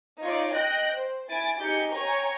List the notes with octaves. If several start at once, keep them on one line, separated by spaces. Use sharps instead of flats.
D#4 F4 C#5 D5
D#5 G5 F#6 A#6
C5
E4 G#5 A6 D7
D#4 G4 G#4 G6 C#7
C#5 G5 G#5 A#5 C#6